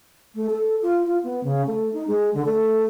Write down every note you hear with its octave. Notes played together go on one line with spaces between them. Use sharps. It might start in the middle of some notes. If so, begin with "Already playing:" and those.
A3
A4
F4
F4
B3
C#3
A3
D#4
G#3
D3
A3